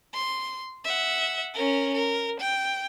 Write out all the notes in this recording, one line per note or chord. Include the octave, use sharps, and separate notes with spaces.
C6
E5 F#5
C#4 A#4
A#4
G5